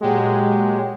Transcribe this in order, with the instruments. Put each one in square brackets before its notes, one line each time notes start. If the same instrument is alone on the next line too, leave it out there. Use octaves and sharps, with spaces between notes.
[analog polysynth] A#2 G#3 [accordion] F#3 G4